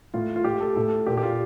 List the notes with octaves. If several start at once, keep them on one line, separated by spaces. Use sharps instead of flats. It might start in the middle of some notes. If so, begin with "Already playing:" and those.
A2 F4
F4
A2 G4
A4
A2 A4
A#2 G4
G4
F4